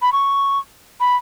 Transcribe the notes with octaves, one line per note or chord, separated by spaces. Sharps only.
B5
C#6
B5